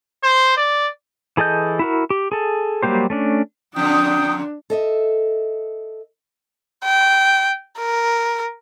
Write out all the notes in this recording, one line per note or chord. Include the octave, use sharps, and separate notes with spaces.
C5
D5
E3 G#4 A4 D#5 G6
E4 F#4 A#4
G4
G#4 A4
F#3 G3 A#3 G4 C5
A3 C#4 D4
F2 A#2 D3 D4 G5 D#6
A4 D#5 E5
G5
A#4